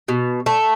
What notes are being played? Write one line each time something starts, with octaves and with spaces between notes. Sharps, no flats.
B2
A3